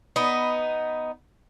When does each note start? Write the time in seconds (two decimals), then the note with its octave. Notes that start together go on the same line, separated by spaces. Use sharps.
0.16 B3 D#4